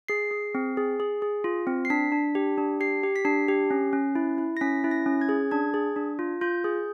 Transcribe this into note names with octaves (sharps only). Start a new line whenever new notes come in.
G#4 C7
G#4
C4
G#4
G#4
G#4
F4
C4
C7
D4 B6
D4
G4
D4
G4 C7
G4
B6
D4 C7
G4
C#4
C#4
E4
E4
A#6
C#4 B6
E4
A#6
C#4
G#6
G#4
D4 G#6
G#4
D4
F4
F4 G6
G#4